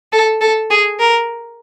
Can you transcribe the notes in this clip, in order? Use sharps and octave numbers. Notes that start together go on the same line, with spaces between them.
A4
A4
G#4
A#4